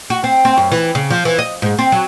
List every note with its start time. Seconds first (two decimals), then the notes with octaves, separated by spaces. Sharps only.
0.10 F#4
0.24 C4
0.45 C4
0.57 F#2
0.72 E3
0.95 C#3
1.10 F3
1.25 E3
1.39 D#5
1.62 G#2
1.79 C4
1.92 F#3